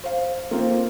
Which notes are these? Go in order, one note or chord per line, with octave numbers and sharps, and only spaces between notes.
C5 F5
A#3 C4 F4 A#4